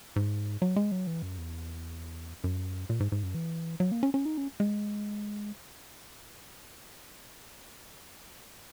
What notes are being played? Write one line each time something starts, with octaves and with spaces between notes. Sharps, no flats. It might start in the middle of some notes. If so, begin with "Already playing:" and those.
G#2
F#3
G#3
F#3
E3
F#2
E2
F#2
A#2
G#2
G#2
F#2
E3
F#3
A#3
C#4
C#4
D#4
C#4
G#3